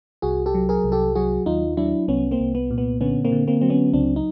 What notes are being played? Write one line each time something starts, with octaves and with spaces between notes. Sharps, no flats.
C2 F#4 G#4
G4 A4
F#3
G#4 A#4
C2
G4 A4
F#3 F#4 G#4
D#2 D#4 F4
F#3 D4 E4
C2 B3 C#4
A#3 C4
C2
B3
A#2
B3
D3 B3 C#4
A#3 C4
D3
A#3 C4
F#3 C4
B3 C#4
C#2 C4 D4
D#4